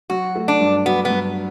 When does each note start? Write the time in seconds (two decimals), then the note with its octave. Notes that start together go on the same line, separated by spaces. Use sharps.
0.10 F#3 F#4
0.35 A3
0.48 D4
0.60 G2
0.86 F#3 B3
1.05 B3
1.10 G2